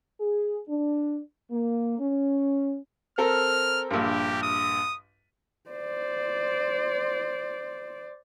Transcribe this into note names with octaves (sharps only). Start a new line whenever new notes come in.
G#4
D4
A#3
C#4
C4 A4 A#4 F6
A#1 G2 G4
D#6
C5 D5